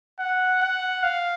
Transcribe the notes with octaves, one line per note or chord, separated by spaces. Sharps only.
F#5
F#5
F5